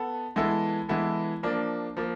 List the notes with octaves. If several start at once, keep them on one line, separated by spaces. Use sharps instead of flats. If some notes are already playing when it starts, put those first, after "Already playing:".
Already playing: B3 A4
E3 G#3 B3 E4 A4
E3 G#3 B3 E4 A4
F3 A#3 D4
F3 A#3